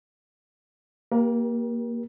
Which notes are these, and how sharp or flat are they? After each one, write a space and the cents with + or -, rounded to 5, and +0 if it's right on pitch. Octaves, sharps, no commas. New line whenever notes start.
A#3 +0 G4 +0 A#4 +40